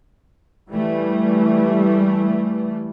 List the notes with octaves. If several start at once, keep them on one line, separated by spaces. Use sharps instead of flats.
E3 G3 A3